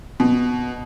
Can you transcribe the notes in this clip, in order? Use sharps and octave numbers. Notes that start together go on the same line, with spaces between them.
B2